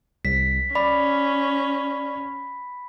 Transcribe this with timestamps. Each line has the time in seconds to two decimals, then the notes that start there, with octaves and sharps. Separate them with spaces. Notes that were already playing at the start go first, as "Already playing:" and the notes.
0.25 C2 B6
0.75 C#4 D5 B5